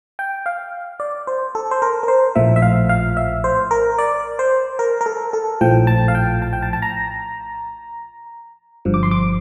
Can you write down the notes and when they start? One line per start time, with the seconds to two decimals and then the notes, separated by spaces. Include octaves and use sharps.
0.19 G5
0.46 F5
1.00 D5
1.27 C5
1.55 A4
1.71 C5
1.82 A#4
2.03 A#4
2.08 C5
2.35 A#1 A2 F3 E5
2.56 E5
2.62 F5
2.89 F5
3.17 E5
3.44 C5
3.71 A#4
3.99 D5
4.39 C5
4.79 A#4
5.01 A#4
5.06 A4
5.33 A4
5.61 A#1 A2 F3 G5
5.87 A5
6.08 F5
6.15 G5
6.42 A5
6.53 G5
6.62 A5
6.73 A5
6.82 A#5
8.85 G1 G2 F3
8.94 D6
9.03 C6
9.11 D6